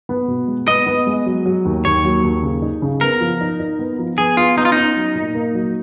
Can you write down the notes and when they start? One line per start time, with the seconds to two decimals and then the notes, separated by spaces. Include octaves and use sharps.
0.09 B3
0.28 B2
0.48 G#3
0.68 B3 D#5
0.86 B3
1.07 G#3
1.26 F#3
1.45 F#3
1.65 D#2
1.85 D#2 C#5
2.04 F#3
2.23 D#2
2.43 C#3
2.62 D#4
2.82 C#3
3.01 B3 A#4
3.21 F3
3.41 D#4
3.60 D#4
3.79 B3
3.99 F3
4.18 B3 G#4
4.37 B3 F4
4.57 B3 D#4
4.65 F4
4.72 C#4 D#4
4.96 F#3
5.15 A#2
5.35 A#3
5.54 F#3